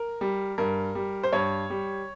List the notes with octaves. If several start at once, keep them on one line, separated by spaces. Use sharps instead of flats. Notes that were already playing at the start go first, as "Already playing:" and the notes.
Already playing: A#4
G3
G2 A#4
G3
C5
G2 C#5
G3